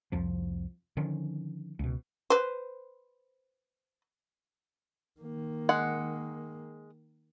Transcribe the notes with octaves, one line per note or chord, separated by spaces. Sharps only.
C2 F2 F3
D3 D#3 F3 C#4
C#2 B2
B4 C5
D#3 A#3
G#3 F#5